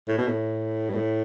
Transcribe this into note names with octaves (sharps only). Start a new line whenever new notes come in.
A2
B2
A2
G2
A2